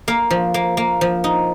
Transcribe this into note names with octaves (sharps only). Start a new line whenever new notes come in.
A#3 F5
F3
A#3
A#3
F3
D#4